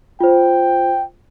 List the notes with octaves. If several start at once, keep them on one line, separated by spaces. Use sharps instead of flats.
F4 C5 G5